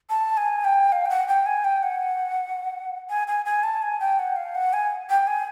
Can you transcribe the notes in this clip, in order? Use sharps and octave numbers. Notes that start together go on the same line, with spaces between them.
A5
G#5
G5
F5
G5
F#5
G5
G#5
G5
F#5
G#5
G#5
G#5
A5
G#5
G5
F#5
F5
F#5
G#5
G5
G#5